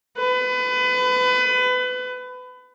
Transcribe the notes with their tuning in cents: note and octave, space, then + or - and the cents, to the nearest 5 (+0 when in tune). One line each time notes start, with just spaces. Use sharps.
B4 +30